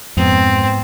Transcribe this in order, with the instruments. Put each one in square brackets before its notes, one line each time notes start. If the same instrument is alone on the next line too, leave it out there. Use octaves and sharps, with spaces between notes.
[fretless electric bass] F2 [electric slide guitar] G#2 B3 [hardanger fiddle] C4